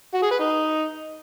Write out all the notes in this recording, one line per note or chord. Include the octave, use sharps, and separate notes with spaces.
F#4
G#4
B4
D#4